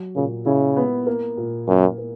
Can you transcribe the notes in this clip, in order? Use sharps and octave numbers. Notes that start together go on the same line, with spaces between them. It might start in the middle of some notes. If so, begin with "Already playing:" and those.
Already playing: F#3
A#2 C#3
C#3 E4
B3
A#3
A#2
F#2 A#3
A#3